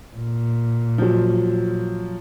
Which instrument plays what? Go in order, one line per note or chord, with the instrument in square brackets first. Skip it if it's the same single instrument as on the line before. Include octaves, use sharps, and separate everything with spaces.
[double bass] A#2
[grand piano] F3 F#3